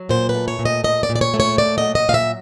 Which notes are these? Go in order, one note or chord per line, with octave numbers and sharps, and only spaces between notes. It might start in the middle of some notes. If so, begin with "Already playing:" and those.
Already playing: F#3
A#2 C5
B4
A3
C#5
A#2
D#5
A#2 D#5
D5
A#2
D5
C#5
A3
C#5
A#2 D5
D#5
F#3
D#5
A#2 F5
E5